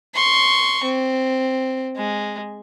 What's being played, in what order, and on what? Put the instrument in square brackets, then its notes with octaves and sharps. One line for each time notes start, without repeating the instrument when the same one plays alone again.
[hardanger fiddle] C6 C#6
C4
G#3